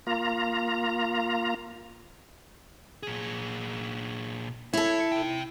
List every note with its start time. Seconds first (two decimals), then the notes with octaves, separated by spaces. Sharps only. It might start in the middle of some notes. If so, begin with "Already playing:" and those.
0.07 A#3 F4 A#5
3.03 A#2 G#4
4.73 E4 A4 C#5
5.12 C3 G5